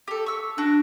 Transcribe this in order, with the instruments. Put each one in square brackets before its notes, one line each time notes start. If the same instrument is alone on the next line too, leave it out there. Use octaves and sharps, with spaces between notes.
[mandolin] G4 A4
C#6 E6
[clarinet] D4 [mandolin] F#4